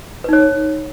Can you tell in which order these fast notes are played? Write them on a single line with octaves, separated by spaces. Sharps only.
B4 D#4 C#5